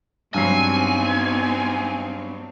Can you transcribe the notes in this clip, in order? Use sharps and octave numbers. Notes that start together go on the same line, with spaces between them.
G2 F#3 B3 C4 D#4 G#5 C7